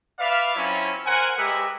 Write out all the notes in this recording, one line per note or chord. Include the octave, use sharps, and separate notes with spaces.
B4 D5 E5 F5
F#3 C4 C#4 E4 F4
A#4 C5 F#5 G#5
G#3 G4 A#4 B4 E5